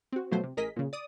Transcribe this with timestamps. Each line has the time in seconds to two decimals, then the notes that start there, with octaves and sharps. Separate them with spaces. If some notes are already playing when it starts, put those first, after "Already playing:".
0.12 C4 F#4
0.31 B2 F3 F#3 A3 C5
0.43 C3
0.57 A1 G#4 A#4 D#5 B6
0.76 A#2 C#3
0.93 D5 D#6